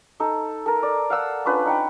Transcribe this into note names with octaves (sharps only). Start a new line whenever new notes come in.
D#4 A4
A4 A#4
D5
F5 F#5 E6
C#4 D4 F4 B4
D#4 F#5 G5